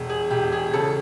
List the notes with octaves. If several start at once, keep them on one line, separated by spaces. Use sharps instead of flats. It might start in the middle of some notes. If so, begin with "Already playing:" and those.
Already playing: E1
G#4
E1 G4
G#4
C#3 A4